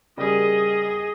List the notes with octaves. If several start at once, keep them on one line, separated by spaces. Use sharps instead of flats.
C#3 G3 A#3 G#4 D#5